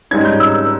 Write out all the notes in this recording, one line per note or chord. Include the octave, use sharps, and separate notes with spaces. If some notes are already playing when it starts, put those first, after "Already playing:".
G#2 G3 C#4 G#6
G6
E6